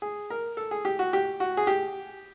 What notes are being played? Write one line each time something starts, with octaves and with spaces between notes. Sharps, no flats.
G#4
A#4
A4
G#4
G4
F#4
G4
F#4
G#4
G4